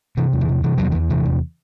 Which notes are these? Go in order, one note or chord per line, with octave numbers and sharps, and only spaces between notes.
C3 E3
E2
E3
C3
C3 E3
E2 F#3
E3
E2
C3 E3
E2